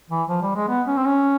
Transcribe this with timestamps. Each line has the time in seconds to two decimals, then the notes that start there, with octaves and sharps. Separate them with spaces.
0.10 E3
0.29 F3
0.42 G3
0.55 G#3
0.68 B3
0.87 C#4
0.97 C4
1.06 C#4